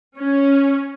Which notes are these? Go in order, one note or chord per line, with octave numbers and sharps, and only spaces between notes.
C#4